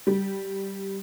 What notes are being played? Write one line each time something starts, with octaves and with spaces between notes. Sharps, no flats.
G3